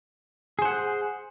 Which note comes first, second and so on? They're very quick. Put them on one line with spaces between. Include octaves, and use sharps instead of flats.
G#4 C5 F#5